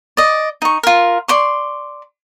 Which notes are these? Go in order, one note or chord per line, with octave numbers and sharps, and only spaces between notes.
D5 D#5
D#4 C#6
F4 A#4
D5 C6 C#6